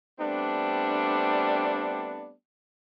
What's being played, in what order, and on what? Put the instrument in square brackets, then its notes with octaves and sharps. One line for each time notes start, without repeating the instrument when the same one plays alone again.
[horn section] G3 A3 B3 C4 D4